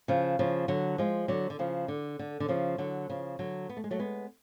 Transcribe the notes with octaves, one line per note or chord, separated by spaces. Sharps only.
C#3 F3
C#3 F3
D3 F#3
F3 G#3
D3 F#3
D3
C#3 F3
D3
D3
D3
C#3 F3
D3 F#3
C#3 F3
D3 F#3
B3
A3
G#3
F#3 A3
G#3 B3